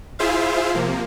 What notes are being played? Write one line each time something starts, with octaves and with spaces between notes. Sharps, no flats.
E4 F4 G#4 C5 E5 F5
C3 F3 A#3